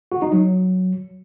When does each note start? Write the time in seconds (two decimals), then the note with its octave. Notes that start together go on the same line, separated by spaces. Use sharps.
0.12 F#4
0.22 D#4
0.32 F#3